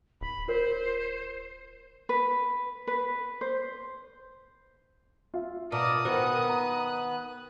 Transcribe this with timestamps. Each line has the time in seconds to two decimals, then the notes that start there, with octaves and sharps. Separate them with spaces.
0.21 D1 B5
0.48 F4 A#4 C5 C#5
2.09 B4
2.87 B4
3.41 C5
5.34 F4 E5 F5
5.72 B2 A#4 D5 A5 D#6
6.05 D#3 B3 F#4 A#4 C5 F#6
6.49 A#5